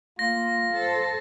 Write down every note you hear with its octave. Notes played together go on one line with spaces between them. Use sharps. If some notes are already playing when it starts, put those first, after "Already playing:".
A#3 F4 A#6
A4 C5